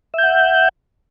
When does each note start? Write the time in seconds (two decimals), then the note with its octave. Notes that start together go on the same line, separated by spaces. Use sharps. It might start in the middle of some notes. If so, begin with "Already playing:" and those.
0.14 E5
0.18 G6
0.23 F#5